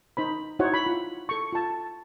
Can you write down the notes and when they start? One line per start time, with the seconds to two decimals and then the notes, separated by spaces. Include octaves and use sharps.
0.17 D#4 C5 B5
0.59 D#4 E4 F#4 C5 C#5 F#5
0.74 B5
0.86 F4
1.29 A4 C#6
1.53 F4 A5